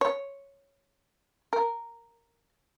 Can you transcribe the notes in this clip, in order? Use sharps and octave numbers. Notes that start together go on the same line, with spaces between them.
C#5
A#4